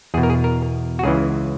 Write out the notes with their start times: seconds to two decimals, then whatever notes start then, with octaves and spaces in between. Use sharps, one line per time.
0.14 E2 G#4
0.17 B2
0.23 A#4
0.30 G#4
0.44 A#4
0.99 F#4
1.03 C#2 C#3 E3 G#4